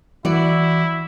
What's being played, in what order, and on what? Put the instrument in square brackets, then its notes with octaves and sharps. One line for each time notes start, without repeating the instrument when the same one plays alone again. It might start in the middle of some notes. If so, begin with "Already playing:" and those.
[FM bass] E3 [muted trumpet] E4 [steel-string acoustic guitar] F#4 D5